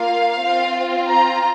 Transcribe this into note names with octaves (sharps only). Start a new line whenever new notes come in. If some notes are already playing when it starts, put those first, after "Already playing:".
Already playing: A#3 F4 F5
C4 F4
A#5